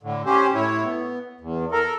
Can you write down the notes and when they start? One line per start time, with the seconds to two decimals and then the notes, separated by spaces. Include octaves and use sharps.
0.03 A2 D3
0.26 C#4 G4 C5
0.54 A2 E4 C#5
0.83 B3
1.40 E2
1.72 A4 A#4